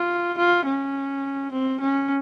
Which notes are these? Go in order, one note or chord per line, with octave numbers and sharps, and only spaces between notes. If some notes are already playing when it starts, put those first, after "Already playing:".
Already playing: F4
F4
C#4
C4
C#4